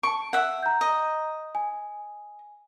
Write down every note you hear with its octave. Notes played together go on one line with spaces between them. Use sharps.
A5 C#6 C#7 D7
E5 F#5
A#5 G6
D#5
G#5